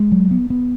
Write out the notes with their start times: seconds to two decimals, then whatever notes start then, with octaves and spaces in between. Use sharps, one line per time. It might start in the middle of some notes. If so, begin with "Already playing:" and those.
Already playing: G#3
0.12 F#3
0.31 B3
0.50 B3